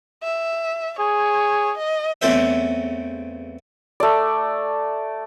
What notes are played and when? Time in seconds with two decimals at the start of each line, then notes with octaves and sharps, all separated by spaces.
0.23 E5
0.99 G#4 C#5
1.78 D#5
2.21 E2 C#3 A3 C4 C5 E5
4.00 A3 D5